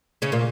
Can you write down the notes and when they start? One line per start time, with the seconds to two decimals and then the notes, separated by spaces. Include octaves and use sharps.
0.22 C#3 C#4
0.32 A#2 A#3